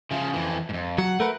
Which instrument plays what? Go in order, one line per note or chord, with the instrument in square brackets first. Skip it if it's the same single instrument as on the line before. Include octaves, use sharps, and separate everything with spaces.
[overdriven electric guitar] C#3 F3
F2 E3
F2 G#2
[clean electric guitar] F#3 [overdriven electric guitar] F#5
[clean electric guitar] A3 A#4 B4